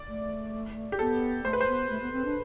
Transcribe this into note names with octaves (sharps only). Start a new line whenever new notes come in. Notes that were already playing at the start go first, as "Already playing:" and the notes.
Already playing: D5
A3
G4
B3 A4
A3 C5
B4
C5
B3
A3
B3
C4
D4